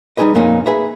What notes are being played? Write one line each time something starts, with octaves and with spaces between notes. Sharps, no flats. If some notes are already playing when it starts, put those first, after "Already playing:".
G3 D#4 G4 G#4 B4 D#5
F2 A#2 A#3 C#4 D#4
G#4 B4 E5 A#5